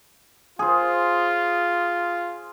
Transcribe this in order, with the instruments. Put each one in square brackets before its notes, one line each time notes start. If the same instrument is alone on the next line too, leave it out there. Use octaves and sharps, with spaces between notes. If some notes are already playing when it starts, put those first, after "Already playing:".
[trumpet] F4 [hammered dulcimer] G#4 C5